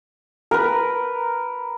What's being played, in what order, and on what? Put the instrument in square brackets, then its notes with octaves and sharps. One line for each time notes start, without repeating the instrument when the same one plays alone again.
[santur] A#4 B4